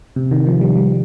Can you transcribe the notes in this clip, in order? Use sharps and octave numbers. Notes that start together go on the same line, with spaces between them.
C3
D#3
F3
G3
G3